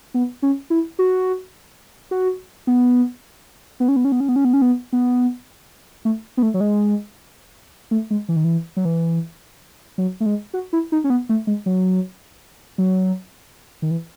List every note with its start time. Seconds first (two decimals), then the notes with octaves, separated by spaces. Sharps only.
0.14 B3
0.42 C#4
0.70 E4
0.99 F#4
2.11 F#4
2.67 B3
3.80 B3
3.88 C#4
3.96 B3
4.05 C#4
4.12 B3
4.20 C#4
4.29 B3
4.36 C#4
4.45 B3
4.53 C#4
4.61 B3
4.93 B3
6.05 A3
6.37 B3
6.42 A3
6.54 F#3
6.60 G#3
7.91 A3
8.11 G#3
8.29 E3
8.36 D#3
8.44 E3
8.77 F#3
8.85 E3
9.98 F#3
10.20 A3
10.26 G#3
10.54 F#4
10.73 E4
10.92 D#4
11.04 C#4
11.10 B3
11.29 A3
11.47 G#3
11.66 F#3
12.78 F#3
13.82 D#3
13.91 E3